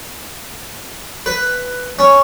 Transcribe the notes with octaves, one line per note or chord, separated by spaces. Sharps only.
B4
C#4